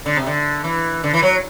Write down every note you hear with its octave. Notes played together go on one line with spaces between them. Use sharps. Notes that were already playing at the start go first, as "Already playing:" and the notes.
D3
C3
D3
E3
D3
E3
F#3